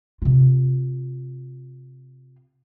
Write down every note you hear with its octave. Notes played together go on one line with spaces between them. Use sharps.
C3 F4